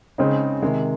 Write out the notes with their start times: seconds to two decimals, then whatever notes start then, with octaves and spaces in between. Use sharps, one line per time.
0.18 C#3 G#3 C4 D#4
0.63 C3 D#3 G#3